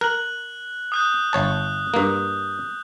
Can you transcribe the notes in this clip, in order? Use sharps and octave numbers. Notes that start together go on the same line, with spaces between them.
A#4 F#6 F#7
D#6 F#6 G6
G1 C#5 A5
G2 A#3